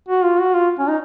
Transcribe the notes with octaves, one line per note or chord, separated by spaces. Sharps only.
F#4
F4
F#4
F4
C#4
D#4